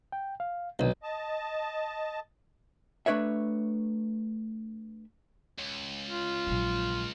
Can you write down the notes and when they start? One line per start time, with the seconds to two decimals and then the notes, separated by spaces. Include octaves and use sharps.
0.12 G5
0.40 F5
0.79 B1 D#3 A#3 D4
1.03 D#5 A5
3.06 A3 D4 B4 C#5 E5
5.59 C#2
6.06 F4
6.47 A#1 F#3